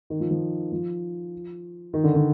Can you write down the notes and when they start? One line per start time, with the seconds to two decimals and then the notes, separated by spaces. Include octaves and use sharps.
0.10 D#3
0.20 F3
0.31 F3
0.72 F3
1.94 D#3
2.04 D3
2.15 D3